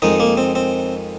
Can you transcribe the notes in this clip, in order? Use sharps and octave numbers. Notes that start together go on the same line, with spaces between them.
F2 D#3 G#3 D#4
A#3
C4
C4